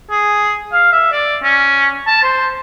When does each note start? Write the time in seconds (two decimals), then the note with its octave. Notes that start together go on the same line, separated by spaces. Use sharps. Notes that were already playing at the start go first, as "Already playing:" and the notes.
0.11 G#4
0.73 F5
0.92 E5
1.12 D5
1.43 C#4
2.07 A5
2.23 C5